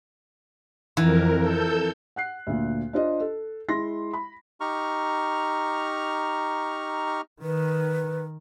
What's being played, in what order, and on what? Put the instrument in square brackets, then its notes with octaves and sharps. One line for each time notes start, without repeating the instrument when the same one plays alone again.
[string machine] F2 A#4 [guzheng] E3
[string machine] A4 E6 G6
[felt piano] F#5 F#6 C7
D2 A#2
D4 F4 C5 D#5
A4
G#3 E4 C6 A#6
B5
[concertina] D#4 G4 A#5 C#6 F6
[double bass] D#3 [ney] B4